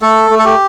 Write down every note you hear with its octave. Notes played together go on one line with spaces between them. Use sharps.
A3 A4
A3
A4
G4